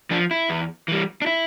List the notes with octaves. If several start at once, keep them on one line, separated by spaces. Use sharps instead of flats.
F3 D4
E4
E2
E3 G3
D4
E4